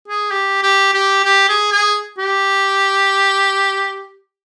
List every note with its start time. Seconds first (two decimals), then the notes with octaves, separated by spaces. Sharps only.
0.08 G#4
0.31 G4
0.63 G4
0.94 G4
1.24 G4
1.49 G#4
1.72 G#4
2.18 G4